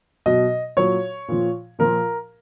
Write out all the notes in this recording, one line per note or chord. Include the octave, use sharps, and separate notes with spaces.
B2 F#3 D#5
A#2 F#3 C#5
A#2 F3
A#2 F3 A#4